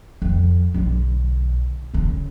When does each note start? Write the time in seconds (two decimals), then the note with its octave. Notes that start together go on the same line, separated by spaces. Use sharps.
0.22 F2
0.74 B1 D3
1.94 D2 C#3